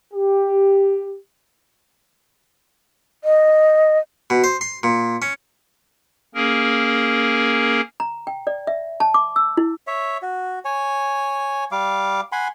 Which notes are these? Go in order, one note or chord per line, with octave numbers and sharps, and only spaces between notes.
G4
D#5
B2
C5
C6
A#2
C#4
A#3 C#4 G#4 A#4
A#5
G5
D5
E5
A5
D6
E6
E4
C#5 E5
F#4
C#5 G#5
G3 F5 D6
F#5 G#5 B5 C6